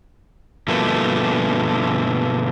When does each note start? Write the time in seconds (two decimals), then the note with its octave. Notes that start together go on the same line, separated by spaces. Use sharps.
0.68 G2 B2 D3 F3 A3 A#3